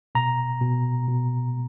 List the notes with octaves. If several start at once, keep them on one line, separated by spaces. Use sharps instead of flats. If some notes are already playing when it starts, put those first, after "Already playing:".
B2 A#5
B2
B2